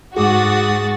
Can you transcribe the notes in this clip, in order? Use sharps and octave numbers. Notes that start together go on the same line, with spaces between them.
G#2 F#4 G#4 D6 D#6 A6